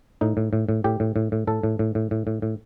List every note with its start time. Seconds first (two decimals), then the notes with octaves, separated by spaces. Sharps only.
0.21 A2 D#4
0.37 A2
0.53 A2
0.69 A2
0.84 A2 G4
1.00 A2
1.16 A2
1.32 A2
1.47 A2 A4
1.63 A2
1.79 A2
1.95 A2
2.11 A2
2.27 A2
2.42 A2